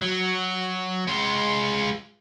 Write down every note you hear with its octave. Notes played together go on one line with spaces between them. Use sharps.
F#3
G#3 F4